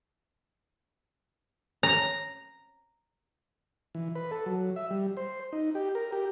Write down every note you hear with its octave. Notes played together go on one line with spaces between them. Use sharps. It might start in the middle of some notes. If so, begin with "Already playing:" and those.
A#5
E3
B4
A4
F#3
E5
G3
C5
D#4
G4
A#4
G4